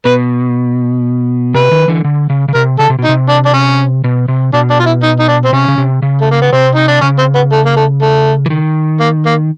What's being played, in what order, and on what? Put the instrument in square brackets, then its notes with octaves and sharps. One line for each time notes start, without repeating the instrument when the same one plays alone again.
[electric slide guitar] B2 [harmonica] B4
[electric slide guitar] C3 [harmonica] B4
[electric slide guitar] D#3
D3 E3
D3
C#3
C#3
[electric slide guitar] C3 [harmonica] A#4
[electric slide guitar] C#3 [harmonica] A4
[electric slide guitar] C3
B2
[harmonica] D#4
[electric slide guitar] C3
[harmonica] D4
D4
C#4
[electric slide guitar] B2
C3
[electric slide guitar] B2 [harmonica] D4
[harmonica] D4
F4
E4
D#4
D#4
D4
C4
[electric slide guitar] C3 [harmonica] C#4
[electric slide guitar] C#3
C3
C#3
[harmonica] A3
A#3
B3
[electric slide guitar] C3 [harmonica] C4
[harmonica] D#4
D4
[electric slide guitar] C#3 [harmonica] C#4
[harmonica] C4
B3
A3
A#3
A3
A3
[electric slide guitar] E3
D#3
[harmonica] A#3
A#3